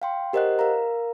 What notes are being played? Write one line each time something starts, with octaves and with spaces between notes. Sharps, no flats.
F5 G5 C6
G4 A#4 C5 D#5 F#5 F#6
A#4 F5 A#5